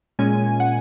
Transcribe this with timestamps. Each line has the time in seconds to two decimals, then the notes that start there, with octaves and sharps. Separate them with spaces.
0.19 A#2 G#3 C#4 G#5
0.60 F#5